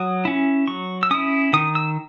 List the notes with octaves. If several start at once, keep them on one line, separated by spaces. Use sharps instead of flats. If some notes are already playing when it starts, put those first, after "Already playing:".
Already playing: F#3 D#6
C#4 E4
F#3 C#6
E6
C#4 E4 D#6
D#3 D#6
E6